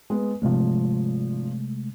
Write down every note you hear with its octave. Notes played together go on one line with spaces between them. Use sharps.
G#3 B3
G#1 C3 F3 G#3 A3